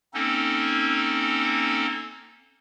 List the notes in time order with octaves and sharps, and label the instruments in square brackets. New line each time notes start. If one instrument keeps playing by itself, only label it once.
[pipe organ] A#3 C4 C#4 D#4 A4